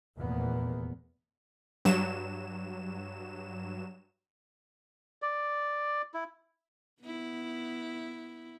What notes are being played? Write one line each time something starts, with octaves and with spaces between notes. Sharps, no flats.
F1 E2 A#2 A#3 B3
G2 F#3 E7
D5
E4
B3 E4